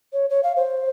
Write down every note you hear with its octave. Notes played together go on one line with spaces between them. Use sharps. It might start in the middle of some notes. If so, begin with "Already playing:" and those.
C#5
C#5
F5
C5